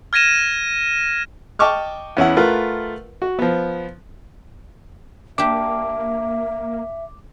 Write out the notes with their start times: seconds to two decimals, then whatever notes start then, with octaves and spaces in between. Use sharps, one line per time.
0.13 F6 G#6 A#6 D#7 E7
1.59 D#5 G5 A5 C#6 D6 F6
2.17 E2 C#4 E4 F#5
2.37 A3 F4 A#4 B4 F#5
3.22 F#4
3.39 F3 B3
5.38 A#3 D4 G4 E5 D6